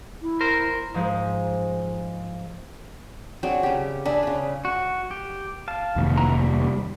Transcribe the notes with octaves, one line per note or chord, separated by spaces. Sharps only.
E4
A#4 C5
G#2 F3 G#3 C5
F#3 C4 D4 G#4
C#3 G4
D4 G#4 B4 E5
C#3 B4
F#4
G4
F5 A5
F1 D#2
E3 A#5
G3